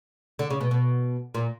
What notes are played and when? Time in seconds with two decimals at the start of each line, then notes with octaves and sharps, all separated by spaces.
0.39 D3
0.50 C#3
0.61 B2
0.71 B2
1.34 A#2